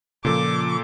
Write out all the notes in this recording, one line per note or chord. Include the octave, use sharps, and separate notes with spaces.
A#2 C#3 F3 A4 D6